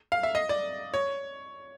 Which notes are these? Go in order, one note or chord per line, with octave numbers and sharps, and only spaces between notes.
F5
E5
D#5
D5
C#5